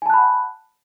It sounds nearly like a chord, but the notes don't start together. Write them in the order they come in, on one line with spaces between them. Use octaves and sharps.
G#5 A5 F#6 B5 F#5